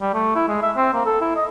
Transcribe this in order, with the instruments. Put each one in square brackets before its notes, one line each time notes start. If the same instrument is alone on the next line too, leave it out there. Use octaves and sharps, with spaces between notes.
[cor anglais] G3
A3
E4
G#3
E5
C4
A#3
A4
E4
D#5